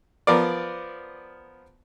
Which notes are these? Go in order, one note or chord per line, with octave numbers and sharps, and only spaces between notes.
F3 B3 A#4 D5